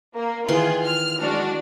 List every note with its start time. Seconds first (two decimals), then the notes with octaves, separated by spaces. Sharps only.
0.15 A#3
0.48 D#3 E3 F4 G#4 C6
0.85 F6
1.22 G#3 D4 F#4